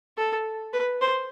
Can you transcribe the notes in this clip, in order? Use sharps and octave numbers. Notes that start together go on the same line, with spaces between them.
A4
B4
C5